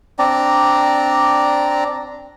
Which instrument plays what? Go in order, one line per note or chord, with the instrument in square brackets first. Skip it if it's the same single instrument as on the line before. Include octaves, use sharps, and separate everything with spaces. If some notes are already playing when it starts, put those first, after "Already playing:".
[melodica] C4 D4 D5 A#5